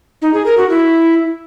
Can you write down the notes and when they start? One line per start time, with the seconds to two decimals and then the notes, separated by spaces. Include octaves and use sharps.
0.22 D#4
0.34 G#4
0.46 A#4
0.58 F#4
0.69 E4